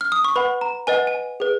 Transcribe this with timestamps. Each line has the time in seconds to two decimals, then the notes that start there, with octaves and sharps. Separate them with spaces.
0.01 F6
0.12 D#6
0.25 C#6
0.36 B4 F#5 B5
0.61 A#5
0.87 B4 D#5 F#5 G#5
1.07 G#5
1.40 G#4 B4